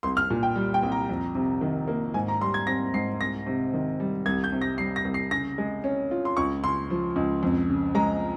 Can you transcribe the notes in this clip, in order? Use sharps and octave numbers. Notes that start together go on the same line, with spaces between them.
C2 C6
F6
A#2
G5
G3
G5
C2
A#5
F2
C3
D#3
A#3
G#2 G#5
A#5
G3 C6
G#6
C4 A#6
G#2 C7
C2 A#6
C3
D#3
G3
C2 G#6
G6
C3
A#6
G3 C7
A#6
C2
C7
C#3 A#6
G#3
C#4
F4
C6
C#2 C#6
C#3 C6
F3
C#2
F2
C#3
G#3 A#5